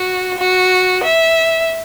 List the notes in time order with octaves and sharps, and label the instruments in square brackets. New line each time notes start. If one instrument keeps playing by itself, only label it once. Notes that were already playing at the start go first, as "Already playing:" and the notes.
Already playing: [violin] F#4
F#4
E5